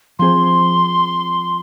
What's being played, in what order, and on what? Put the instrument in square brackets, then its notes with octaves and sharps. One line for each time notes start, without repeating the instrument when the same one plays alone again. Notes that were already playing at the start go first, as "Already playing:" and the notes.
[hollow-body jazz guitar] F3 C4 G#4 C5 [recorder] C6